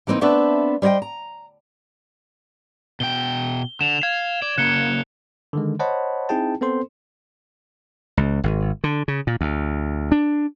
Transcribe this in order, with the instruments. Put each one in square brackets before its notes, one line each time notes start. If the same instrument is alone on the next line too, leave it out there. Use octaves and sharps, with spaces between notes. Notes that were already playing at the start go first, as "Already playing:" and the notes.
[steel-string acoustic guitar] E3 A#3 C4 D#4 E4
A3 B3 C4 D4 B4 E5
G3 C5 C#5 D#5 G5
A#5
[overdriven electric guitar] B2 G5 [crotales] G7
[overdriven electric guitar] D3 [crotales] E7 F7
[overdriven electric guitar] F5 [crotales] G#6
[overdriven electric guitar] D5
[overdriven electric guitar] C#3 A#3 [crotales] F#6 C#7 G7
[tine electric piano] D3 D#3 G#3
C5 C#5 D#5 F#5 A5 B5
C4 D#4 E4 G#4 G5 A5
B3 C4 A4 C5 C6
[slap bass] C#2
G#1
D3
C#3
A#2
D2
D4